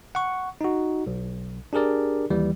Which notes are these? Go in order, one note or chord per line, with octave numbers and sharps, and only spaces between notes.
F#5 C#6
D#4 F#4
B1
D4 G4 G#4 A#4 D5
D#2 E3 G3